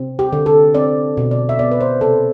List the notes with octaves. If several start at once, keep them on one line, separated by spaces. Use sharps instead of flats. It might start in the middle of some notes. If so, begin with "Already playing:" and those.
Already playing: C3 C4
G4
D3
A4
C4 D5
B2
D5
E5
B3 D5
B4
C5
C3 A4